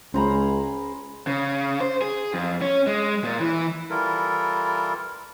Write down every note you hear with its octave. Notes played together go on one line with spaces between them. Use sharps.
C#2 G#3 C#4 G#4 C5 A#5 B5
C#3
C5
G#4
F2
C#4
G#3
A#2
E3
E3 G3 E4 F4 A4 A#4